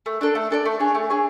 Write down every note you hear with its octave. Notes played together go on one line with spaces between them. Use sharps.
A3
D4 A4 D5
A3
D4 A4 D5
A3
D4 G#4 C#5
A3
D4 G#4 C#5